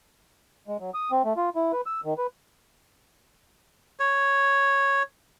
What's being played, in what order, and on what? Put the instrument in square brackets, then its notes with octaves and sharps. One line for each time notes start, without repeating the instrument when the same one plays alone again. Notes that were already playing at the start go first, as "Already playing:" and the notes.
[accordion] G#3
F#3
D#6
C4
A3
F4
E4
B4
E6
D#3
B4
[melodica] C#5